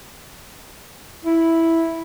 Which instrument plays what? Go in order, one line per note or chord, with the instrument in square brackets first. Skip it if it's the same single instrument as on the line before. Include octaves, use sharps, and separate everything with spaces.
[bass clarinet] E4